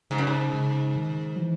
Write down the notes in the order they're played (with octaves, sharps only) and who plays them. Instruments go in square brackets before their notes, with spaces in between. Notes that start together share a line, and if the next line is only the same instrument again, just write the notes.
[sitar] G#2 [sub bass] C#3
[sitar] F#2
G#2
[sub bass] C#3
D#3
F#3
E3